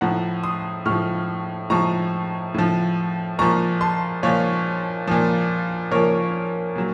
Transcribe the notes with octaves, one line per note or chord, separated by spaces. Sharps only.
A2 F3 F#5 A#5
C6 D#6
A2 F3 C#6 F6
A2 F3 A#5 C#6
A2 F3
A#2 F3 A#5 C#6
A5 C6
A#2 F3 C#5 F5
A#2 F3
A#2 F3 A#4 C#5
A#2 F#3